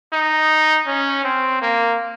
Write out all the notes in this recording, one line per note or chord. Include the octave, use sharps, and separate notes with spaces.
D#4
C#4
C4
A#3